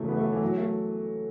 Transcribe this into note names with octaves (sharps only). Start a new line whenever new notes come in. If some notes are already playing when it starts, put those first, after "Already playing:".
Already playing: C#3 E3 F#3 A3
B3
A3
E3
F#3
A3